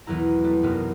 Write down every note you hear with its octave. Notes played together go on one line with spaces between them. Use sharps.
B1 E2 E3 F#3 E4 A#5
G3 A3 B3
B1 F#2 C3 D#4 F#4 A#4